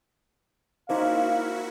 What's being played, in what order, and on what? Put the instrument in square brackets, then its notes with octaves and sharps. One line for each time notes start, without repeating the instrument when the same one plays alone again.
[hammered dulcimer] A#3 C#4 [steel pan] D#4 C5 E5 [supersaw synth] E4 F#4 [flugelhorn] F5